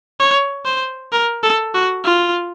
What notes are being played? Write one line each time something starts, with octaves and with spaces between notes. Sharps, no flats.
C#5
C5
A#4
A4
F#4
F4